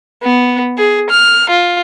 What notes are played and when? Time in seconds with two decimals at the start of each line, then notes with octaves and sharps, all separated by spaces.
0.23 B3
0.78 G#4
1.10 F6
1.49 F4